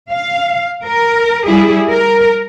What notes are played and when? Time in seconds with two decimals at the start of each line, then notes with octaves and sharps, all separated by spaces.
0.11 F5
0.85 A#4
1.47 G3 E4 G#4
1.91 A#4